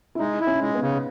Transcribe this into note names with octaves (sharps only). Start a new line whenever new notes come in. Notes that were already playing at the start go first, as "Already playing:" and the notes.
E4
G#3 D#4
E4
C#4
G#3
B3
C#3